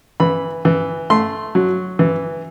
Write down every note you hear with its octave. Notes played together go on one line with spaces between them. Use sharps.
E3 B5
E3
A3 C6
F#3
E3